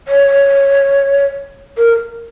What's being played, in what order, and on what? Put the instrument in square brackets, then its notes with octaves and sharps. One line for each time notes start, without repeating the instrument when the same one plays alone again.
[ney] C#5
A#4